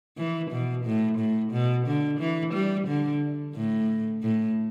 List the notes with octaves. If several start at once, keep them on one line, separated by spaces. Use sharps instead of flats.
E3
B2
A2
A2
B2
D3
E3
G3
D3
A2
A2